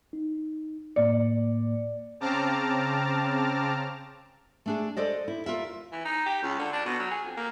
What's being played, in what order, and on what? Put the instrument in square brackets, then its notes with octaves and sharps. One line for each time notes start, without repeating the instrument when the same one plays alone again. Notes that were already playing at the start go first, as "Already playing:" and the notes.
[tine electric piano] D#4
[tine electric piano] A2 A#3 C#7 [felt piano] D5
[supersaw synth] C#3 C4 A5 A#5 D6 F6
[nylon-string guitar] A3 D4 G#4
A4 C5 D5 D#5
E4
F4 A#4 E5
[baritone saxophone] E3
D#4
G4
C#2
D3
D4
B2
F#3
G#4
F2
A#3